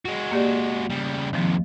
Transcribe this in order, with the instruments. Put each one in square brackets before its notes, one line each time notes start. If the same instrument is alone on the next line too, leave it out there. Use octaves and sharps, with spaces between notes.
[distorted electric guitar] G#3 F#4
[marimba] A#3 G4 D5
[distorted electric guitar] C#3 G3
[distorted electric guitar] D#2 C3 [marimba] D#3 F3